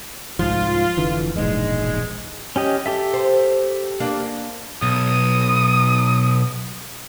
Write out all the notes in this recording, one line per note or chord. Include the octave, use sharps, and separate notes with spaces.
C2 G#2 F3 F4
F1 D3 E3
E1 A#1 G#2 G#3
C#4 G4 D#5
G4 A4 E5
C5
A#3 D4
B1 D#6